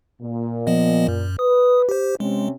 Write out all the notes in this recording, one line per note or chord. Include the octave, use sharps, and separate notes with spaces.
A#2
F3 B3 D#5
F#2
B4 D#6
G4 C5
C3 G#3 C4 C#4